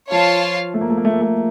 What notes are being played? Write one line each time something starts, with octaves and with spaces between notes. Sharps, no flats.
F3 F4 C#5 F5 A5
A3
A#3
A3
A#3
A3
A#3
A3